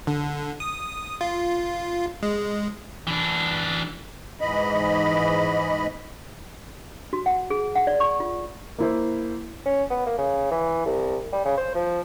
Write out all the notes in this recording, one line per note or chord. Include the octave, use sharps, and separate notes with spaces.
D3
D#6
F4
G#3
E3 D4
G#2 E3 D#5 B5
F#4
F#5
G#4
F#5
D5
C#6
F4
A#3 E4 C5
C#4
B3
A#3
C#3
E3
C2
G3
C#3
C5
F3